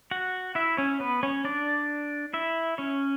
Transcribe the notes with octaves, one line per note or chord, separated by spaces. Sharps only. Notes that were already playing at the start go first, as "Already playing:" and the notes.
F#4 F#5
E4 E5
C#4 C#5
B3 B4
C#4 C#5
D4 D5
E4 E5
C#4 C#5